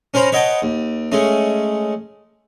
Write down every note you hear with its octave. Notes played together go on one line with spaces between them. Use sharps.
C#4 A#4 C5 A#5 B5
B4 C#5 D#5 F#5 G5 A5
D#2
G#3 A3 C#4